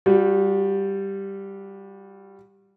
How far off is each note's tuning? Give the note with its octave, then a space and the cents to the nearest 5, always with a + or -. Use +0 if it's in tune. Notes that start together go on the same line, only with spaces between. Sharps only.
G3 +0 F#4 -35